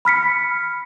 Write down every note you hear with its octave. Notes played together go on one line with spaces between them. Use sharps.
B5 F6 B6 C#7